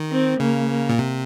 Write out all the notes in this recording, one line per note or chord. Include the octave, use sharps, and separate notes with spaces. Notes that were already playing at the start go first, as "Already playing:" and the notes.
Already playing: D#3
C4
C#3 A#3
A#3
A#2
C3